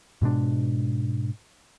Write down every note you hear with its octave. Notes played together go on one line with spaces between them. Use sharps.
G#2 B2 G#3 D4